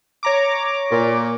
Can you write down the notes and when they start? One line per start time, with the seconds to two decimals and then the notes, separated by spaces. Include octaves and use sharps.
0.23 C#5 A#5 D6
0.91 A#2